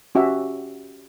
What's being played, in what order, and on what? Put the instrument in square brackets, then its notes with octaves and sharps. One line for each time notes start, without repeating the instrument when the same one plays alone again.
[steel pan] C#4 F#4 G4 E5